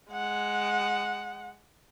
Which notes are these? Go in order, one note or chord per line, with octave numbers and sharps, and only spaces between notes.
G#3 F#5